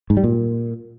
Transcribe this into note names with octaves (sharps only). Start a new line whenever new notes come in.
G#2
G3
A#2